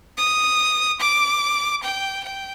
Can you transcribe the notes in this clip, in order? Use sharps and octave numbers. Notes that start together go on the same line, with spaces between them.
D#6
D6
G5
G5